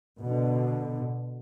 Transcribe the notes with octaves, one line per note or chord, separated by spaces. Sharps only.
B2 D3